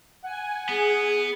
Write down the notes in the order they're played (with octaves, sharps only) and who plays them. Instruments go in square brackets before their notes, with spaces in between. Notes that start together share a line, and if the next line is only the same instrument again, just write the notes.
[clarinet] F#5 [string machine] G#5
[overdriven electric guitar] B3 [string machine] G#4